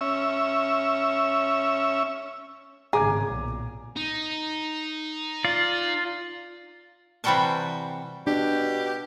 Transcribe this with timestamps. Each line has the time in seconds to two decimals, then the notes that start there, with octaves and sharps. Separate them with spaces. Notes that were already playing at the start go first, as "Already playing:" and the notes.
0.01 C#4 E5
2.93 G#1 A2 C#3 G#4 A#5 D6 G#6
3.25 B1 A#2
3.96 D#4
5.45 F4 D5
7.24 C3 E3 G3 F#4 G5 A5
8.27 B2 D4 G4